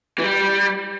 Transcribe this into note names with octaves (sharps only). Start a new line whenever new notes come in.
E3
G3